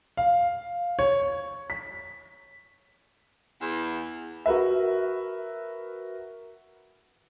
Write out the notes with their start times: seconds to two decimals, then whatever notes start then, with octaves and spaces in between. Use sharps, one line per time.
0.17 F5
0.99 C#5
1.70 B6
3.61 E2
4.46 F#4 A#4 B4 E5